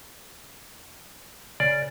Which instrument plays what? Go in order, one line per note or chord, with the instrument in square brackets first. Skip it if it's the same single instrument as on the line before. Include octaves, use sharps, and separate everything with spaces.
[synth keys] C#3 [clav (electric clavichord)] D5